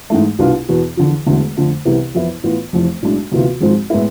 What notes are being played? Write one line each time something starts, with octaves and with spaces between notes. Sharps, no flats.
G#2 E3 A3
C2 B2 B3 D4 F4
E2 B2 B3
E2 D3 F3
E1 E2 D3 A3
F2 D3 F3 A3
C2 C3 E3 B3
F2 E3 B3 E4
A2 E3 B3 F4
F1 F2 E3
B1 A2 G#3 D4
D2 C3 E3 B3 F4
G#1 G#2 F3 G#3 C4
A2 G#3 B3 E4